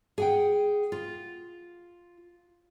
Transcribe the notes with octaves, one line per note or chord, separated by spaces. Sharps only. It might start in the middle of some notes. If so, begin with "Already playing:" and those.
G#4 F#5 G5
F4